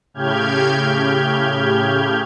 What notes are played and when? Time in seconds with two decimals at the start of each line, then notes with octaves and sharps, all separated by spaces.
0.14 A2 C#3 G4 F6 G6 G#6